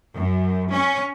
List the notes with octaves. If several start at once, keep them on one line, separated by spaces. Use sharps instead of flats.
F#2
C#4